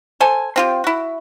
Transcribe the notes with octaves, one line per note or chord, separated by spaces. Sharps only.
A4 C5 G#5
C4 F4 G4
E4 F#4